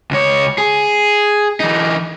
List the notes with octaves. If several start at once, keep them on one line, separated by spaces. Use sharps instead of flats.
C#2 C#5
G#4
E3 D#4